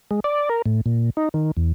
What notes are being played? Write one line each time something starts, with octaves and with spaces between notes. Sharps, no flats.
G#3
D5
A#4
A2
A#2
D#4
D#3
E2